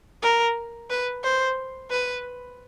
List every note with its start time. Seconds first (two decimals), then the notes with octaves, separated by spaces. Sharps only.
0.23 A#4
0.90 B4
1.24 C5
1.91 B4